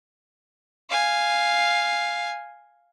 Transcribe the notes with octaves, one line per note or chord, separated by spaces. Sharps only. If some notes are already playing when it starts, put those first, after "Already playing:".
F5 G#5